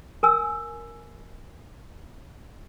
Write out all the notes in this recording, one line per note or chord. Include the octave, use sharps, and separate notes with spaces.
A#4 G#5 E6